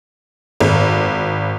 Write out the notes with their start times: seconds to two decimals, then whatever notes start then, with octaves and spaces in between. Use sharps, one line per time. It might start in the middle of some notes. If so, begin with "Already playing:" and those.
0.60 G#1